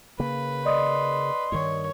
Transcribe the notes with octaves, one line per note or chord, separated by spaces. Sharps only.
C#3 A#3 B4
D5 D#5 C6 D#6
G2 D#3 C#5